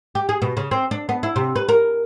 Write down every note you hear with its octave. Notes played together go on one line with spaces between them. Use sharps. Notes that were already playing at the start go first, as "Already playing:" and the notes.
G4
G#4
B2
C#3
C4
D4
B3
E4
C3
B4
A#4